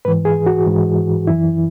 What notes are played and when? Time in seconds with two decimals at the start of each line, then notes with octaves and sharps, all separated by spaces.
0.05 G#2 E3 B4
0.25 G#4
0.46 F#4
0.66 G#2 E3
1.27 F#2 E3 E4